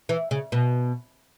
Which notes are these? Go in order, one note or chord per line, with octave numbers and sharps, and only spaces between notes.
E3
C#3
B2